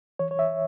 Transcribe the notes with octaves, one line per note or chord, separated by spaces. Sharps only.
E3 C#5
C#5
E5